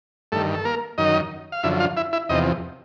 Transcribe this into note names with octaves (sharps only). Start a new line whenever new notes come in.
G2 D#3 A3 A4
A4
A#3 A#4
F#2 D#3 D#4 D#5
F5
F#2 D3 F3 E4 E5
F4 F5
E4 E5
E4 E5
E2 C3 F3 D#4 D#5